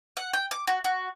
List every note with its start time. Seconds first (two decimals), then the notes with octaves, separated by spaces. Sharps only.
0.17 F#5
0.33 G5
0.51 D6
0.67 F#4
0.84 F#4